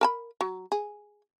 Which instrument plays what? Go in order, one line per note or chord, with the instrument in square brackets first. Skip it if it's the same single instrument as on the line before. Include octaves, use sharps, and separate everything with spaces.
[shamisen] A#4 A5 B5
F#3
G#4